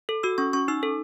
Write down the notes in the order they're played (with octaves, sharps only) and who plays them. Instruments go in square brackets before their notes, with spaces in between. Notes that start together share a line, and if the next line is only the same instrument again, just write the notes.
[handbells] A4
F#4 E6
C#4 C#6
C#4 C#6
D#4 E6
A4